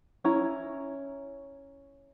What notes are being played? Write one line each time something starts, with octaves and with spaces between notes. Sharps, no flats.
C#4 E4 C#5 A#5